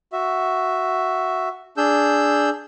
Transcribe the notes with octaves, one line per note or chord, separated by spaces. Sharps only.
F#4 E5
D4 G#4 E6 G6